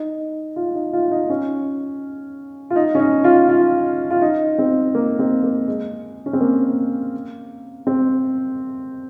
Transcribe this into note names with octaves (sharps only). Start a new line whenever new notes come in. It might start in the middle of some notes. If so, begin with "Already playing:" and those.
Already playing: D#4
F4
D#4
F4
D#4
C#4
F4
D#4
C#4
D#4
F4
F4
F4
D#4
C4
A#3
C4
A#3
G#3
C#4
C4
A#3
C4